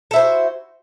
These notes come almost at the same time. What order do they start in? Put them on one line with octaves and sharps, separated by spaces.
A4 E4 C5 F#4